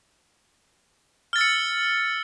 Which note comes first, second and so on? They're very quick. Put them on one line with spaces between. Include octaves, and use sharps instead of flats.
F6 A6 E6 C#7